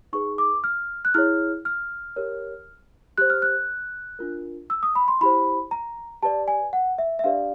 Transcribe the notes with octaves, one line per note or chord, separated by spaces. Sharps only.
D#4 G#4 B4 C#6
D6
F6
F#6
E4 G#4 C#5 F6
F6
G4 A#4 C#5
G4 C5 F#6
F6
F#6
D4 F4 A#4
E6
D#6
B5
C6
E4 G4 C5 B5
A#5
G4 B4 D5 A5
G#5
F#5
E5
E5
D4 G4 B4 D5 F5